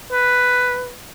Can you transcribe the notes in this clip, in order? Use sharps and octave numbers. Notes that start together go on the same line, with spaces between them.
B4